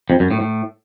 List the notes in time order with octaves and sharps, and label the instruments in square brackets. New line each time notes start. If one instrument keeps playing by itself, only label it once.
[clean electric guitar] F2
F#2
A2
A2